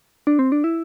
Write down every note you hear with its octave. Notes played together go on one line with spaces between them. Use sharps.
D4
C4
D4
E4